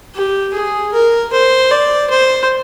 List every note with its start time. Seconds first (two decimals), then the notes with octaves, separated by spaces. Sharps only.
0.15 G4
0.54 G#4
0.93 A#4
1.32 C5
1.71 D5
2.09 C5